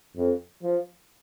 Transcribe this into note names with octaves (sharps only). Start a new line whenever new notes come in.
F2
F3